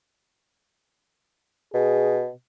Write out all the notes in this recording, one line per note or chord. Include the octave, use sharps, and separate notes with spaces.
B2 G#4